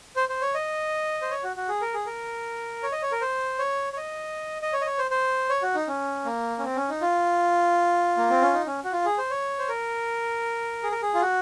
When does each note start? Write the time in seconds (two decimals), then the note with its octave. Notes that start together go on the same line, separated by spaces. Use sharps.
0.16 C5
0.29 C5
0.42 C#5
0.54 D#5
1.22 C5
1.30 C#5
1.44 F#4
1.56 F#4
1.69 G#4
1.82 A#4
1.94 G#4
2.06 A#4
2.83 C#5
2.92 D#5
3.02 C#5
3.12 A#4
3.21 C5
3.59 C#5
3.93 C#5
3.97 D#5
4.62 D#5
4.73 C#5
4.81 D#5
4.86 C#5
4.99 C5
5.11 C5
5.50 C#5
5.62 F#4
5.75 D#4
5.88 C#4
6.25 A#3
6.59 C#4
6.64 C4
6.76 C#4
6.89 D#4
7.02 F4
8.17 A#3
8.30 C4
8.42 C#4
8.54 D#4
8.67 C#4
8.84 F#4
8.92 F4
9.05 G#4
9.18 C5
9.31 C#5
9.59 C5
9.68 A#4
10.83 G#4
10.92 A#4
11.02 G#4
11.14 F4
11.21 F#4